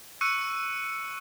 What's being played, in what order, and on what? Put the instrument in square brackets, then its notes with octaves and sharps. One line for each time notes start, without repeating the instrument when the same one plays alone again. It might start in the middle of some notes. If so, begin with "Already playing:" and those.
[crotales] C#6 E6 F#6 C#7 D#7